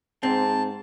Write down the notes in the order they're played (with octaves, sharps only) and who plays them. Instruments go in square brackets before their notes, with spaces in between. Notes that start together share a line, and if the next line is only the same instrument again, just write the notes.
[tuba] G#2 [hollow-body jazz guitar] C4 [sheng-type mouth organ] A5